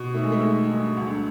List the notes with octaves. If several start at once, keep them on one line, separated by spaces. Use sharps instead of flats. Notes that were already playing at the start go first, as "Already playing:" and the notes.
Already playing: B2
D#3 A3
G#3
A3
D#3
G2
D2